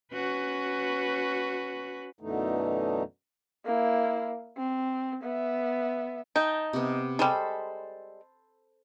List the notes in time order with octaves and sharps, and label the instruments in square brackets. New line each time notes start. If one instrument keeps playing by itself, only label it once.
[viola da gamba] C#4 F#4 B4
[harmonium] F#2 B2 D3 E3 A3 D#4
[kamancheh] A#3 E4
C4
B3 E5
[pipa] D#4 [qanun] G5 A5
[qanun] C3 B3
[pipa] G3 G#3 [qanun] A4 C5 B5